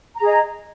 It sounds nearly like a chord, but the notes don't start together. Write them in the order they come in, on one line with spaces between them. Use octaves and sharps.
A#5 G#4 D#5